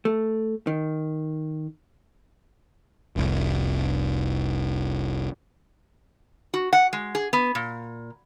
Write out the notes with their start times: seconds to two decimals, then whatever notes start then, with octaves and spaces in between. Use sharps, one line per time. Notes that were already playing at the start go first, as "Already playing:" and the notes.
0.05 A3
0.67 D#3
3.16 F1 C2
6.54 F#4
6.73 F#5
6.93 G#3
7.15 G#4
7.33 B3
7.55 A#2